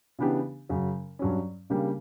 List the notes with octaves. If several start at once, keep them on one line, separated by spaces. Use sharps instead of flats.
C#3 E3 B3 D4 G4
F#2 C#3 F#3
G2 F#3 C#4
C#3 G3 A#3 D4 G4